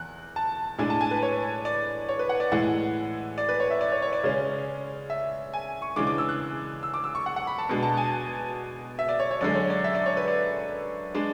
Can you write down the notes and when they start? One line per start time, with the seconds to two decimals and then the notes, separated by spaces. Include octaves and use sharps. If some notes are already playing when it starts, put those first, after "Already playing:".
Already playing: E2 F#6
0.36 A5
0.78 A2 G#3 D4 G#5
0.90 A5
1.01 G#5
1.11 B4
1.22 C#5
1.65 D5
2.09 C#5
2.19 B4
2.29 F#5
2.40 D5
2.52 A2 E3 G#3 F#5
3.38 D5
3.49 B4
3.60 C#5
3.71 E5
3.81 D5
3.92 C#5
4.02 C#5
4.13 D5
4.24 C#3 G#3 C#4
5.10 E5
5.54 G#5
5.82 C#6
5.96 C#3 E3 G#3 D4 D6
6.07 D6
6.18 E6
6.29 F#6
6.83 E6
6.94 D6
7.04 E6
7.15 C#6
7.26 F#5
7.36 F#5
7.47 B5
7.58 A5
7.69 B2 G#3 D4
7.83 A5
7.97 G#5
8.99 E5
9.09 D5
9.19 C#5
9.31 C#5
9.41 F#2 D3 G#3 D5
9.55 C#5
9.70 D5
9.84 E5
9.95 D5
10.06 C#5
10.17 B4
10.28 D5
11.15 G#3 D4